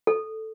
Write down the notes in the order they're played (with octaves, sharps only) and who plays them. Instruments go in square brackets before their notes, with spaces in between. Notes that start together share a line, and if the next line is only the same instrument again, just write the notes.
[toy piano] A4